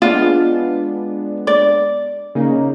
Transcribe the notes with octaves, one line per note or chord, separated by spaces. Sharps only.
G#3 B3 D4 F4
D5
C#3 A#3 D#4